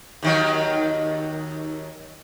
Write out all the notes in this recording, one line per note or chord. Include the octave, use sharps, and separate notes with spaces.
D#2 D#3 F#3